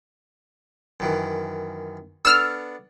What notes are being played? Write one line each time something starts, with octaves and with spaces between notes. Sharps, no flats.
F#2 D#3 E3
B3 D4 A4 E6 F6